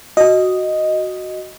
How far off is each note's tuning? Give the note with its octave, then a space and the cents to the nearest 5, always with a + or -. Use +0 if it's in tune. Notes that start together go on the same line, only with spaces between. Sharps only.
F#4 +0 D#5 +0